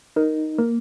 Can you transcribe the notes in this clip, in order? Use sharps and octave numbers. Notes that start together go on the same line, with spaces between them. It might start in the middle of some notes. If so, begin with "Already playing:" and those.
D#4 A#4
A#3 A#4